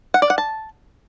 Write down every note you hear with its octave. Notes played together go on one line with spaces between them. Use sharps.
F#5
D5
F#5
A5